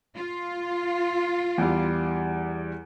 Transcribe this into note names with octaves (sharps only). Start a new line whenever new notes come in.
F4
E2 G3